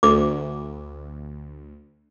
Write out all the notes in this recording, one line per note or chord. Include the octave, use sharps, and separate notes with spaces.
D2 D6